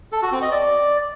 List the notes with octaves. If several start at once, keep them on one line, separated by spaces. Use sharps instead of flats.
A4
F#4
C4
D#5
D5